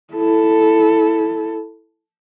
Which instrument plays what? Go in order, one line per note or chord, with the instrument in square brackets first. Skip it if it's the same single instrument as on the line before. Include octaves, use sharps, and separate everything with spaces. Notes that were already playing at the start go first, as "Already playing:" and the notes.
[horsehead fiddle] E4 A4